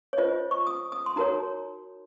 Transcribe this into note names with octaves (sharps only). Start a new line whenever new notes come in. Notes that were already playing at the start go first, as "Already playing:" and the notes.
C#5
F4 C5 D#5
C#6
D#6
D#6
C6
D#4 F#4 A#4 C#5 A#5